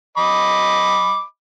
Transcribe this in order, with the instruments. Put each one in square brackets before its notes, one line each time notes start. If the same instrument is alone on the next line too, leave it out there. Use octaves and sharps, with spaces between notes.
[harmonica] D#5 B5 D6